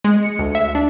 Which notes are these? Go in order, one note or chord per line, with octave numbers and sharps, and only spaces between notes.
G#3
C#7
D2
E5
D4